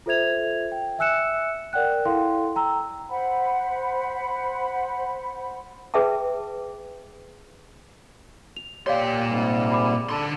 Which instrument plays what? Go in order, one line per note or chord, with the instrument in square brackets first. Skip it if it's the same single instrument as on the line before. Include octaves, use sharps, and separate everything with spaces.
[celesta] F4 A4 C5 E5 G#6 F7
G5
E5 G#5 E6 F#6 C#7 E7
A#4 D5 F#5 G5 F#6
E4 A4 F5 G5 C6
G5 A#5 E6
[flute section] C5 F#5 B5
[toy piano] G#4 B4 E5 G5 A5
[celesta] F7
[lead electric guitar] A#2 C6 [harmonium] G4 [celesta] C#5 D5 F5
[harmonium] G#2 C3 G3
[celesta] B5 D6
[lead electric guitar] D3 C6 [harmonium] D4 A4